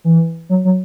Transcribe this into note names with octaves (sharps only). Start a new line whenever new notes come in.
E3
F#3
F#3